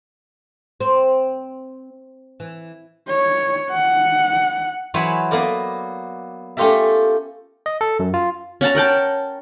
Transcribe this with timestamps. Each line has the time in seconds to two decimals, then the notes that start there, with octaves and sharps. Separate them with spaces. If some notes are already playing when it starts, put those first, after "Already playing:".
0.80 C4
2.40 E3
3.08 C#5
3.71 F#5
4.94 E3 F#3 C5 C#5 G#5 B5
5.31 A#3 B3 A#4 D5
6.57 A3 C#4 F4 G4 A#4 E5
7.66 D#5
7.81 A4
7.99 F#2
8.14 F4
8.61 C#4 F#5 A5 A#5
8.75 A#4 F#5 G5 A5